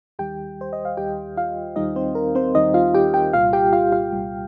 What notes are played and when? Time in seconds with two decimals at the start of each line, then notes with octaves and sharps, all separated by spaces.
0.19 D#2 D#3 G3 G4 G5
0.61 C5
0.73 D#5
0.85 F5
0.97 D#2 D#3 G3 G4 G5
1.37 F4 F5
1.76 D#2 D#3 G3 D#4 D#5
1.96 C4 C5
2.15 A#4
2.35 C4 C5
2.54 D#2 D#3 G3 D#4 D#5
2.74 F4 F5
2.94 G4 G5
3.14 G4 G5
3.33 C2 A#2 G3 F4 F5
3.53 G4 G5
3.73 F4 F5
3.92 F4 F5
4.12 C2 A#2 G3